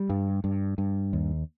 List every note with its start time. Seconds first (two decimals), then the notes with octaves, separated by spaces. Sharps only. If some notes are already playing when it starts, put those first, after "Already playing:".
Already playing: G3
0.10 G2
0.44 G2
0.78 G2
1.13 D#2